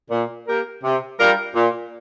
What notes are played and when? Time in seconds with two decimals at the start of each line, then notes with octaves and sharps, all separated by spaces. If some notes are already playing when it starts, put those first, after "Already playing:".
0.11 A#2
0.48 A#3 G4 A#4
0.84 C3
1.19 G3 D4 F4 A#4
1.55 A#2